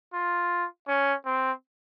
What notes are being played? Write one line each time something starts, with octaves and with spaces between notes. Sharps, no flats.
F4
C#4
C4